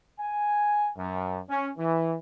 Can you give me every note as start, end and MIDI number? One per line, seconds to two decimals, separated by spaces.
0.19 0.89 80
0.97 1.39 42
1.50 1.70 61
1.78 2.15 52